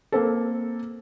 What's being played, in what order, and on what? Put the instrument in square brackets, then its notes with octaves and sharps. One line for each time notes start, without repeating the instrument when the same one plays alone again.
[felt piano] A#3 C4 A4